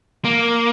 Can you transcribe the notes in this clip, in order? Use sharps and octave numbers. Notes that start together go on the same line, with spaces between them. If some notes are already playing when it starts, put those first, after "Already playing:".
A#3